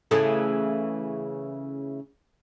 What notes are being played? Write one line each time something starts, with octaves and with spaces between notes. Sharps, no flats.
C#3 E3 A3